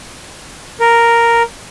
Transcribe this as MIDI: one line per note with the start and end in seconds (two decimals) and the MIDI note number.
0.80 1.43 70